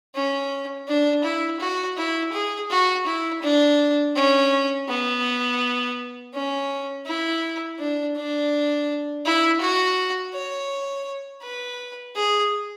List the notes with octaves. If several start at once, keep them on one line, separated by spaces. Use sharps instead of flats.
C#4
D4
E4
F#4
E4
G#4
F#4
E4
D4
C#4
B3
C#4
E4
D4
D4
E4
F#4
C#5
B4
G#4